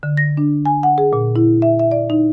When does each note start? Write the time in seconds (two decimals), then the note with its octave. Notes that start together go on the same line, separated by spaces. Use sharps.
0.03 D3
0.17 A#6
0.37 D4
0.65 G#5
0.83 F#5
0.98 G#4
1.13 A#2
1.36 E4
1.62 E5
1.79 E5
1.91 D5
2.10 D#4